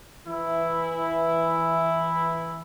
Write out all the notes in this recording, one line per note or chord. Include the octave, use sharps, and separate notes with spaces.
E3 E4